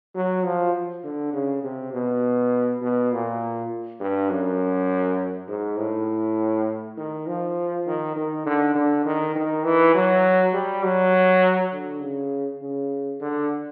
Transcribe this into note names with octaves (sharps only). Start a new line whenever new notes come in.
F#3
F3
D3
C#3
C3
B2
B2
A#2
G2
F#2
G#2
A2
D#3
F3
D#3
D#3
D3
D3
D#3
D#3
E3
F#3
G3
F#3
D3
C#3
C#3
D3